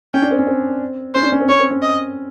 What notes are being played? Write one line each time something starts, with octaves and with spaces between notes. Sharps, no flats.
C#4 G5
D4
C4
C#4
C4
C#4 C5
D4
C#4
C4
C#4 C#5
C4
C#4
D#5